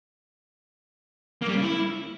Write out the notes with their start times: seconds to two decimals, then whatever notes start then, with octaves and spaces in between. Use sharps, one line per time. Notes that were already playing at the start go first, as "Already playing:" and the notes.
1.42 A#3
1.48 G3
1.55 C#3
1.62 E4